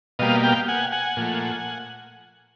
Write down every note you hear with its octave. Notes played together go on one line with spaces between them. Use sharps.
B2 G3 A#3 D#5 F5
F5 G5
F#5 G#5
F#5 G#5
A#2 F3 A3